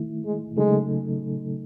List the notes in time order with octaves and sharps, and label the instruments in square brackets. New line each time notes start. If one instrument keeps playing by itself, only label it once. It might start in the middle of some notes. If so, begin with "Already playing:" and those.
Already playing: [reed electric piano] D#3 A3 E4
[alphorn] G#3
[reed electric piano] C#3 F#3 A3 D#4 A4 [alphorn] G#3